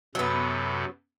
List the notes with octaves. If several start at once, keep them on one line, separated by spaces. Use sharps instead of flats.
F#2 C3 F#3 B3 A4